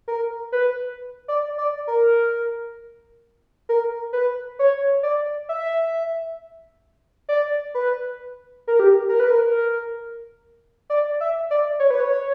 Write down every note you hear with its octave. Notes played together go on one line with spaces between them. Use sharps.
A#4
B4
D5
D5
A#4
A#4
B4
C#5
D5
E5
D5
B4
A#4
G4
A#4
B4
A#4
D5
E5
D5
C#5
B4
C#5